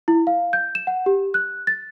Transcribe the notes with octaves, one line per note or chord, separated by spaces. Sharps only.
E4
F5
G6
E7
F#5
G4
F#6
A6